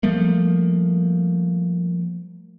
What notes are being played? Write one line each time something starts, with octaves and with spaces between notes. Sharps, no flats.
F3 G3 A3 A#3